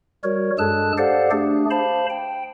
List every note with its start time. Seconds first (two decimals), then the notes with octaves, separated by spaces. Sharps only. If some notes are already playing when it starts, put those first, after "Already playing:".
0.24 G3 F#4 A#4 C#5
0.58 G2 G#3 G#4 A4 A5 F#6
0.98 G4 A4 C5 D5 F5 F#5
1.31 A3 D4 G4 G#4
1.71 C5 F5 A5 B5
2.10 G5